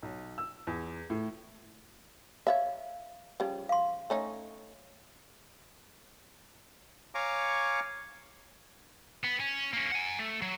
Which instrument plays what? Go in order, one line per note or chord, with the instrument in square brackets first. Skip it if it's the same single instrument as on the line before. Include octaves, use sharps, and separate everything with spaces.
[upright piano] B1
E6
E2
A2
[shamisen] C#5 D5 E5 [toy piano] F5
[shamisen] C#3 F3 G3
[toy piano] F5 C6
[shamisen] A3 C#4 D#4
[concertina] C#5 F5 G#5 A#5 C#6 D6
[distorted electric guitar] B3
C#4
A#3 C#4
F#5 G#5
A3
F#3